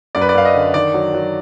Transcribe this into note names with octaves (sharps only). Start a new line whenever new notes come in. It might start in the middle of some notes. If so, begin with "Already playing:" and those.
F#2 D5
B4
D5
F#2 F5
D#5
D3
D#3 D5
F#3
F#3